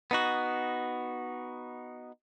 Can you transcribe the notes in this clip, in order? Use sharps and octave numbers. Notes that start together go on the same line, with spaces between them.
B3 D#4 F#4